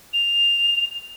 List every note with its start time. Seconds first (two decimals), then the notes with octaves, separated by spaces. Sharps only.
0.13 F7